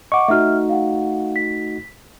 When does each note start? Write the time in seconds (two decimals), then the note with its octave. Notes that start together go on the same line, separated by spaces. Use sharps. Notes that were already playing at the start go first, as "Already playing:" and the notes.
0.12 D#5 F#5 C#6 D6
0.28 A3 D#4 F#4 E5 F6
0.70 F5 F#5
1.36 B6